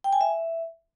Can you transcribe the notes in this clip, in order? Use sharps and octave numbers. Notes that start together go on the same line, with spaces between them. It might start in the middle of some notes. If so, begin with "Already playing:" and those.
G5
G#5
E5